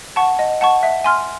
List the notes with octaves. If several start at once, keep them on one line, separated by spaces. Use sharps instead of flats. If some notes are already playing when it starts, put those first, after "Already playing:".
F#5 A5 C#6
D#5
F#5 A5 C#6
E5
G#5 C6 F6